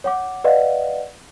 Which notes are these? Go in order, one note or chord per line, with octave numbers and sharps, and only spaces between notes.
C#5 F#5 D6
B4 D5 D#5 F5 F#5